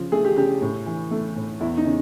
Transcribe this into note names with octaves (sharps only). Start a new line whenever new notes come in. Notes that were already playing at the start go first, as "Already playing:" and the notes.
Already playing: C#3 F3
A3 G#4
G4
C#3 G4
A2
E3
A3
A2
E2 E4
D#4
C#3